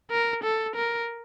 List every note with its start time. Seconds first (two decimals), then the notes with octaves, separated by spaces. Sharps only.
0.11 A#4
0.44 A4
0.76 A#4